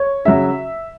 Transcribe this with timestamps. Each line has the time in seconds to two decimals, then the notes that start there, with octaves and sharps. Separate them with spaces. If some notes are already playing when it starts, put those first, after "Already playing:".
Already playing: C#5
0.25 C#3 F#3 E5